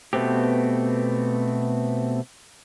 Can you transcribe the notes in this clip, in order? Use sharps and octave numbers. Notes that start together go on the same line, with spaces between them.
B2 A3 B3 C4 G4